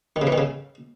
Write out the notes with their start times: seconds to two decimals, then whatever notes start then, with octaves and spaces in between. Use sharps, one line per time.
0.16 D#3
0.22 C#3
0.27 E3
0.32 D#3
0.38 C#3